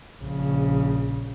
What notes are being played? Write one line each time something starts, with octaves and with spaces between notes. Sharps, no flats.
A#1 C#3